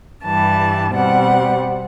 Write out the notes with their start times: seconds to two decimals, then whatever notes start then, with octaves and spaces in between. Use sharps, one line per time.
0.24 G2 E3 G3 A5
0.92 B2 G3 C4 F#5